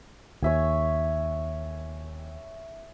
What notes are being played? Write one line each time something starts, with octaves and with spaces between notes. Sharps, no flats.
D#2 C#5 E5 G#5